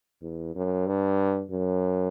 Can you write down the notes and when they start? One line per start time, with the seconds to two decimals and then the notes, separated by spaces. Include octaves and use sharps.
0.22 E2
0.55 F#2
0.86 G2
1.51 F#2